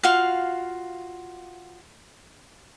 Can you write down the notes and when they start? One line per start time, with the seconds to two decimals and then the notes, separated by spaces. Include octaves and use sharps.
0.03 F4 F#4 F5